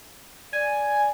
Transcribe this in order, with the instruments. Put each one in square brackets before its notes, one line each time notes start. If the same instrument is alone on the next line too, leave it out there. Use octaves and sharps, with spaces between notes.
[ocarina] D5 [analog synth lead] G#5